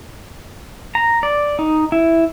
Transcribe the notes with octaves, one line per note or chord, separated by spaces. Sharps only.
A#5
D5
D#4
E4